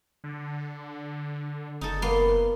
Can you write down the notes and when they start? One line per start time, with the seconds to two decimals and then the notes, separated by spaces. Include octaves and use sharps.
0.24 D3
1.81 F#1 D#4 A4
2.02 A#3 B3 C6